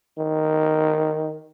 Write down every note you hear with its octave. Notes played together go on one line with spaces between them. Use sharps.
D#3